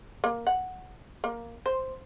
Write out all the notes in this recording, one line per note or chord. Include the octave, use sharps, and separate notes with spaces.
A#3
F#5
A#3
C5